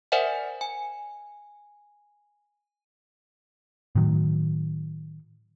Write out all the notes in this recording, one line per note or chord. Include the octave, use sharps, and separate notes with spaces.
A#4 C5 D5 E5 F#5 G#5
G#5
A2 D#3 F#3